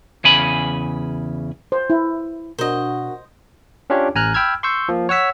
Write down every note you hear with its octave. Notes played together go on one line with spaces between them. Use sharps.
E2 C#3 G#5 B5
C5
E4
B2 D4 F#4 A#4 C5 D#5
C#4 D4 F4 G4 C#5
A1 G#5 A#5 F6 F#6
G5 B5 E6 F6 G#6
C6 C#6 E6 G6
F3 A#3
C#5 F#5 E6 B6